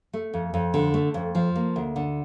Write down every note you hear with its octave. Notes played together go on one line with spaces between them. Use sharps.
A3
F2
F2
D3
A3
F2
F3
A#3
D2
D3